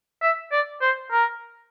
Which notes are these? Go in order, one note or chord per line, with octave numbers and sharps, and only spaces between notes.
E5
D5
C5
A#4